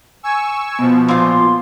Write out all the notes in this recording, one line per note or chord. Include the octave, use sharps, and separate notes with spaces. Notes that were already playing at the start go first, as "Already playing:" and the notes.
G#5 C#6 E6
B2 F3 B3
A#2 F4 C6